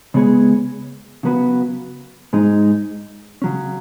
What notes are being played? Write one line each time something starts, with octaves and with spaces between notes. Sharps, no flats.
C#3 G#3 B3 G#4 C#5
C#3 F#3 B3 F#4 B4
G#2 G#3 D#4
C#3 F#3 C#4